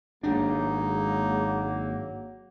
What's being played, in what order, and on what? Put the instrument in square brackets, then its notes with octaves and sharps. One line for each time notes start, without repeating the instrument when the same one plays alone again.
[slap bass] G#1 D4 [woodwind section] F#3 A#3 [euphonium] G#3 [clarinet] D#4